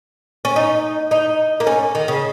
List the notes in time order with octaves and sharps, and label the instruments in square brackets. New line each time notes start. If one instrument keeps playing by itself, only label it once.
[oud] C#4
D#4
D#4
A#3
C#4
D#3
C#3